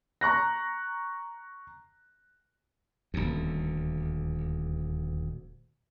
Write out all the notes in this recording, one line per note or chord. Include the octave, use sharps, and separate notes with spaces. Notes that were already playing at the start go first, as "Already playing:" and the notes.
A#5 C#6 F#6 A#6
D#1 D2